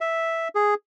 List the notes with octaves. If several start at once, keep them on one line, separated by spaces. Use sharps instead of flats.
E5
G#4